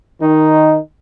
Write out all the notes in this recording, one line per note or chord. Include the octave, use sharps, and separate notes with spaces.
D#3 D#4